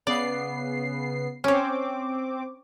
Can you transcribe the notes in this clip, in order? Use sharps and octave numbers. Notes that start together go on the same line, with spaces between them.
C#3 B3 D5 C7
C4 C#4 C#5 D6